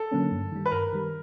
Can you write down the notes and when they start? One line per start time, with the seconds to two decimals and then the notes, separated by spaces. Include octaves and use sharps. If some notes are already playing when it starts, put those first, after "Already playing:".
Already playing: A4
0.11 D3 F#3 A#3 C#4
0.32 G2
0.52 D#3 G3
0.66 B4
0.71 G2 A#4
0.93 D#3 G3